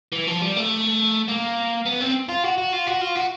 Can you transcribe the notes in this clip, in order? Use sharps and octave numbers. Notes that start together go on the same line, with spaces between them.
E3
F3
G3
A3
A#3
B3
C4
F4
F#4
F#4
F4
F#4
F4
F#4